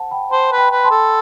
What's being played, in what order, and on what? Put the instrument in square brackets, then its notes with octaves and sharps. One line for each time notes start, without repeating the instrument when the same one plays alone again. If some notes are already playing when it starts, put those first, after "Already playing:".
Already playing: [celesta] C5 F#5 A5
G5 B5
[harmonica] C5 [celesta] A5 C6
[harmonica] B4
[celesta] G5 B5
[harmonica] B4
[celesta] A5 C6
[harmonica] A4